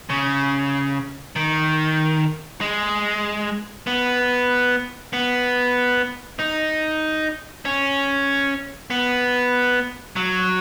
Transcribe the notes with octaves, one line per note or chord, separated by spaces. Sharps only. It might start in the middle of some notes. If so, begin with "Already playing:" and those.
C#3
D#3
G#3
B3
B3
D#4
C#4
B3
F#3